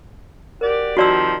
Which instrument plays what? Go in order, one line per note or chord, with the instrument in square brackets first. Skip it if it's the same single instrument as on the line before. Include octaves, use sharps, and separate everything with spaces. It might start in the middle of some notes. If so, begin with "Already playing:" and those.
[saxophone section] F#4 G4 D5 [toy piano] A#4
[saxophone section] C3 D#3 F3 [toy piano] F#4 D5 E6